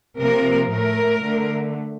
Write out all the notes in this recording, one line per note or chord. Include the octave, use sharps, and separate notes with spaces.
C3 F3 A#3 A#4
A2 A3 A#4
D3 A3